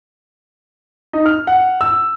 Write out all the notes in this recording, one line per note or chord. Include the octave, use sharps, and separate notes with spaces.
D#4
F6
F#5
E6